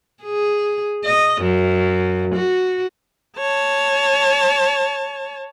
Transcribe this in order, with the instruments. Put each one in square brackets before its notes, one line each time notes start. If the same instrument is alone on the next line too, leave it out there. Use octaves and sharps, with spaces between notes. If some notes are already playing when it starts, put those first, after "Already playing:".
[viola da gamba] G#4
D#5
F#2
F#4
[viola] C#5 A5